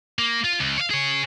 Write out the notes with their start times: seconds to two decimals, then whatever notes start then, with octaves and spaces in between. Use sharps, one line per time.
0.19 A#3
0.44 F4
0.60 C#2
0.78 C#5 F5
0.90 G#4 C#5